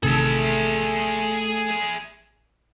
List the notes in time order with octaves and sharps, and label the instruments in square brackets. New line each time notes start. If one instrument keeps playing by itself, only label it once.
[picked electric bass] A1 C3 D#3 [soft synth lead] A3 [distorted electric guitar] G#4 E5 [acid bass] A4